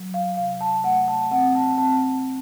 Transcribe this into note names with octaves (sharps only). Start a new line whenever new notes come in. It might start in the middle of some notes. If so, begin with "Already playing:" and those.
Already playing: F#3
F5
C3 F5
A5
A3 F#5
A5
C4 F#5
A5
C4 A5